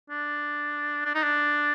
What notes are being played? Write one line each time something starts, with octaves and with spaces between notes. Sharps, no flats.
D4
D4
D#4
D4